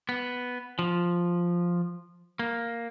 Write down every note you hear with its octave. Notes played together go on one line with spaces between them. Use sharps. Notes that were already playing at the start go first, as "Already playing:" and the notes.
B3
F3
A#3